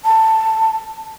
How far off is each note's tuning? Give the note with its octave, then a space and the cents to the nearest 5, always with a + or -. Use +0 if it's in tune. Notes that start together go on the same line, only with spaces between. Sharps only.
A5 +15